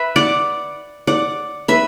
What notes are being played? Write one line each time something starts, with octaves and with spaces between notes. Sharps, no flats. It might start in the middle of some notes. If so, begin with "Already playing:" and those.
Already playing: B4 E5
D5 F#5
D5 F#5
B4 E5